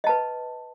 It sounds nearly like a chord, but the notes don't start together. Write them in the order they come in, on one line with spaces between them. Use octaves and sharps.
D#5 A5 B4